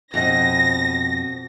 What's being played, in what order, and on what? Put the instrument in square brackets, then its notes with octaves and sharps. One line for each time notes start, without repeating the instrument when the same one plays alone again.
[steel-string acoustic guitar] F2 B2 D#5 [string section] A#6